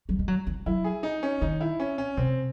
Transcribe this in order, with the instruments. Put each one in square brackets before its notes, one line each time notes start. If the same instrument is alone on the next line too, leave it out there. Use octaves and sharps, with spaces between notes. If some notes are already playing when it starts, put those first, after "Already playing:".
[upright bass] F#3
G#3
F#3
E3
[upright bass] F#3 [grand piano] E4
[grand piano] G#4
D#4
C#4
[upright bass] D#3 [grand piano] D#4
[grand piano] E4
C#4
C#4
[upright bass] C3 [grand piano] C4